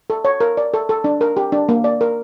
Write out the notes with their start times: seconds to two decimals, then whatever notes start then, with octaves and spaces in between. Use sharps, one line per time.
0.10 A4
0.25 C#5
0.41 A#4
0.57 D5
0.74 A4
0.89 A4
1.04 D4
1.21 A#4
1.37 G4
1.52 D4
1.69 A#3
1.84 D5
2.01 A#4